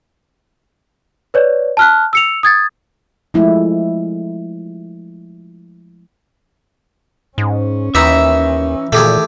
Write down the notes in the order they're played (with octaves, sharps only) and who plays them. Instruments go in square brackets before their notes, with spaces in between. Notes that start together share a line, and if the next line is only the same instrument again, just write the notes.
[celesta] B4 C#5 D5
A5 F6 F#6
E6 C#7 F7
D#6 G#6 A6
[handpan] F3 G#3 A3 E4
[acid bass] G#2 [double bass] C#4
[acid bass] D#2 [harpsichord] E3 D#4 A#5 [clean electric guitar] E5
[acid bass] A#2 [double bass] D#3 E3 [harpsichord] A3 G4 G#4